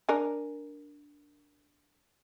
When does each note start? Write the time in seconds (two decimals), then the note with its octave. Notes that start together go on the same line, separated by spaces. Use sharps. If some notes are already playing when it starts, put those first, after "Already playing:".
0.09 D4 A#4 G#5